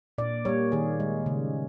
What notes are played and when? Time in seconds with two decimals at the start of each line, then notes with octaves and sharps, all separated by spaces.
0.18 A#2 D5
0.45 G3 A#3 C#5
0.72 D#3 G#4
1.00 G#3
1.26 C#3